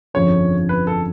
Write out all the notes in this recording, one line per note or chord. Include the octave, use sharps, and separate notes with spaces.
G1 F2 C#3 F3 C#5
B4
A4